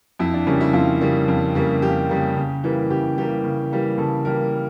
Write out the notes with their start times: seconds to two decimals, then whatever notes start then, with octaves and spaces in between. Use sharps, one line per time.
0.19 F2 E4
0.34 D4
0.47 C#3 G3 A#3 C#4
0.61 E4
0.73 F2 F4
1.01 C#3 G3 A#3
1.28 F2
1.55 C#3 G3 A#3
1.82 F2 G4
2.10 C#3 G3 A#3
2.36 C#3
2.64 E3 G3 A#3
2.90 C#3 G4
3.17 E3 G3 A#3 G4
3.44 C#3
3.71 E3 G3 A#3
3.98 C#3 A4
4.25 E3 G3 A#3 A#4